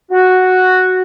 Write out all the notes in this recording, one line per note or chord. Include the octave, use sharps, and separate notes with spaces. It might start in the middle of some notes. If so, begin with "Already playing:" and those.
F#4